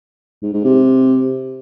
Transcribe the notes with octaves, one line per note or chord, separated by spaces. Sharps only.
G#2
G#2
C3